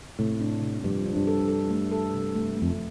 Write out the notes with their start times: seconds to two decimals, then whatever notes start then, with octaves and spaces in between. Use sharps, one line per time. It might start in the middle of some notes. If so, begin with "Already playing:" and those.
0.19 A2 C3
0.41 D4
0.62 C3
0.84 G2 F3
1.06 D4
1.16 G2
1.27 A4
1.48 A4
1.70 A3
1.92 A4
2.14 C3
2.35 A3
2.57 A3
2.62 F2